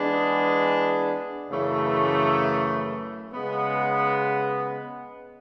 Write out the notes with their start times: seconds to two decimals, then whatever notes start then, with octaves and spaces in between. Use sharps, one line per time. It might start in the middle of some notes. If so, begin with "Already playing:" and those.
Already playing: E3 G#3 B3 D4 G#4
1.49 F#2 C#3 E3 A3
3.33 C#3 G#3 B3